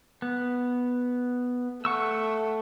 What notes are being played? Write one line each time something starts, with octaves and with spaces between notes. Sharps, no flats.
B3
A3 F#5 C#6 E6